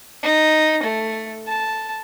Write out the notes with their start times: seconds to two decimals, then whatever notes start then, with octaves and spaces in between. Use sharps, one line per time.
0.23 D#4
0.83 A3
1.47 A5